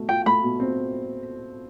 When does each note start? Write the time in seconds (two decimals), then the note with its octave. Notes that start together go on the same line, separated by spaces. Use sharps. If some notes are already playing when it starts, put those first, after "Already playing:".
Already playing: B2 A3
0.09 F4 G5
0.26 A3 B5
0.43 B2
0.60 C4